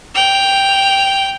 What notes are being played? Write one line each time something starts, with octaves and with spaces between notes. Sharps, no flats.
G5 F7